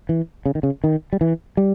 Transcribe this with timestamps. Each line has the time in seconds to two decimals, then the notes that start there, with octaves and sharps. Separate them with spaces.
0.09 E3
0.46 C#3
0.55 D#3
0.63 C#3
0.84 D#3
1.13 G3
1.21 E3
1.57 G3